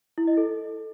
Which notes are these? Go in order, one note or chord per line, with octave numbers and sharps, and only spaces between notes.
E4
D#5
A4